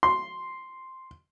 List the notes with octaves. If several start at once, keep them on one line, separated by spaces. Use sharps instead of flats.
C6